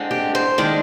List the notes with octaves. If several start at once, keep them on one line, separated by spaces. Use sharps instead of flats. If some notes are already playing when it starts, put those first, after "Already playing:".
Already playing: D3 G#3 C4
G4
C5
D#3 G#3 D4 D5